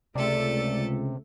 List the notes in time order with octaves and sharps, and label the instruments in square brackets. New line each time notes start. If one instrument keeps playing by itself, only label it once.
[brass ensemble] C#2 [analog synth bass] C3 [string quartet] A3 A4 [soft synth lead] D5